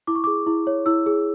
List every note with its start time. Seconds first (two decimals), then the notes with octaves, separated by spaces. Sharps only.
0.07 E4 D6
0.16 C#6
0.24 G#4 D6
0.47 E4
0.67 C#5
0.86 E4 E6
1.06 G#4